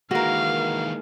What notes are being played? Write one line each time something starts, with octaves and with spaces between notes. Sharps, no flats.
D#3 E3 G#3 A#3 F#4 A#4 F5